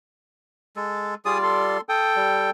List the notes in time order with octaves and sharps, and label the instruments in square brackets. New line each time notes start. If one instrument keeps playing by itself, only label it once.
[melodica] G#3 A4
[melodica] G3 F4 D5 [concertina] G#4 D#6
[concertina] A4 C6
[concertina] A4 G5 [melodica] D#6
[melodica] G3